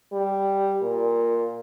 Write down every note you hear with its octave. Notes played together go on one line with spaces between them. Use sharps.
G3
A#2